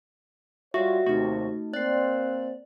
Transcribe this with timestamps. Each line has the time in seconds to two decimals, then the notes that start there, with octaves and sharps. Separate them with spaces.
0.74 G3 F4 F#4 C#5 E5 F#5
1.06 D#2 C3 A3 D#4 F#4
1.74 A#3 C4 D5 F#6 C7